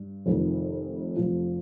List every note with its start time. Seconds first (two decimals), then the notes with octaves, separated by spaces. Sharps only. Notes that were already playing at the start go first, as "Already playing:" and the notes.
Already playing: G2
0.26 F1 F2 D#3
1.17 F1 F2 F3